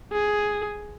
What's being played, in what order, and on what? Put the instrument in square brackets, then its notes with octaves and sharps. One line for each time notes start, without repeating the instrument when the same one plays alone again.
[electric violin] G#4